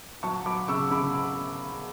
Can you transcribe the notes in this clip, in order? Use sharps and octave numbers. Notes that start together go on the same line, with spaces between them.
F#3 A5 C#6
F#3 B5 D6
C#3 C#6 E6
C#3 B5 D6